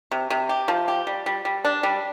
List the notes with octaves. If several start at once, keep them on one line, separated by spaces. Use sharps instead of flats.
C3
C3
G4
F3
G4
G3
G3
G3
D4
G3